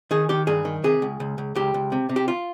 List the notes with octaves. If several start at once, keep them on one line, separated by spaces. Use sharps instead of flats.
D#3 G#4
D#3 G4
G2 G#4
D#3
C3 G#4
C#2
C#2
C#2
C#2 G4
C#2
C3
C3
G4
F4